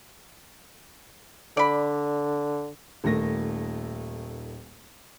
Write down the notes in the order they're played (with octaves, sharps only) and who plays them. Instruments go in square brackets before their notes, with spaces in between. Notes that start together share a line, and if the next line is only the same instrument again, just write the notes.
[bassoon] D3 [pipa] D5 B5
[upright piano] D#1 D#3 A3 A#6